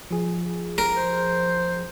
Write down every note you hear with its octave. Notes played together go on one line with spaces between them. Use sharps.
F3 G#4
A#4
C5